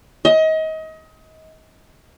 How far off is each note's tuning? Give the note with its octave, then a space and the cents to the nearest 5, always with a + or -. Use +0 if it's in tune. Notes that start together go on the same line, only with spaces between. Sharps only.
D#5 +30